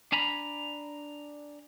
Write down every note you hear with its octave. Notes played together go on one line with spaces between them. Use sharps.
D4 G#5 A#5 B5